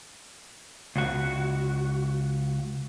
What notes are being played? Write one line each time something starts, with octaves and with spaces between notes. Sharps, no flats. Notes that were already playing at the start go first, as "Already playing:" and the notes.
C#2 F#4